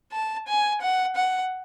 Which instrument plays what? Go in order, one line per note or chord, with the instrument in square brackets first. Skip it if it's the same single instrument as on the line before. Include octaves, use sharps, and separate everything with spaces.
[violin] A5
G#5
F#5
F#5